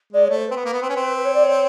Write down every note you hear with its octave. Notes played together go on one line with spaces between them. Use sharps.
G#3 D5
C#5
A3
C5
C4 B4
B3
A#3
B3
C4
C#4
C4
B4
C#5
D5
C#5